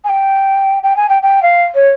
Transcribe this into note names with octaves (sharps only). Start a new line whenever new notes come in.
G#5
G5
G5
G#5
G5
G5
F5
C#5